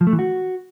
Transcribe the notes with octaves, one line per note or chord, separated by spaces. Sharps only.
F3
A3
E3
F#4